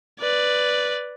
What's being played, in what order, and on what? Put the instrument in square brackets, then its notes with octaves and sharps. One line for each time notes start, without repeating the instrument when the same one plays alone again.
[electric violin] B4 D5